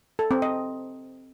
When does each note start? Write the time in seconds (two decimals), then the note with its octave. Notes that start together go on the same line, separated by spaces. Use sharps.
0.19 A4
0.31 C4
0.42 D#5